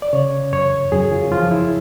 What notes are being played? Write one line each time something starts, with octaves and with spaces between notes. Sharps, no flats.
D5
C#3 C#5
F#2 C#5
F#2 G#4
F4
F3 F4
E4